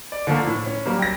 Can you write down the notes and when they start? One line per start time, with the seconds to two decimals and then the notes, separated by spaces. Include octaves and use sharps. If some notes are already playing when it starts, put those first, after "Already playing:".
0.12 D5
0.27 D3 F3 A3 A#3
0.47 A2
0.66 C#4
0.86 F#3 G3 A#3
0.99 G5 A#6